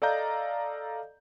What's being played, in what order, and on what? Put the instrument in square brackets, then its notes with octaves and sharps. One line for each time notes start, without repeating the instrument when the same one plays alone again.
[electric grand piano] A4 D5 D#5 F5 A#5 G6